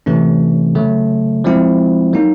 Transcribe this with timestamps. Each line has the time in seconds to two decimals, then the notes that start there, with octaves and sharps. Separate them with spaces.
0.06 C3 E3 A3 C#4
0.75 C#3 F#3 A3
1.44 F3 G#3 C4 E4
2.13 F#3 A#3 D#4